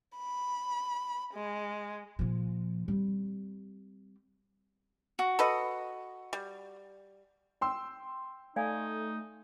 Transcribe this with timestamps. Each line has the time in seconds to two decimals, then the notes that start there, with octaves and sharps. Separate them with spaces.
0.16 B5
1.33 G#3
2.19 A#2 F3
2.88 G3 C4
5.19 F#4
5.39 A4 B4 D#5
6.33 G3
7.61 G5 C6 E6
8.56 A3 D#4 D5 F5 G#5